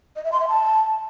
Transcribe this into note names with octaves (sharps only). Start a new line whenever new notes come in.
D#5
E5
C6
E5
A5